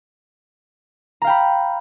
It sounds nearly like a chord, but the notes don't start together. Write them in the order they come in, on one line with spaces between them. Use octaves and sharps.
A#5 F5 G5 B5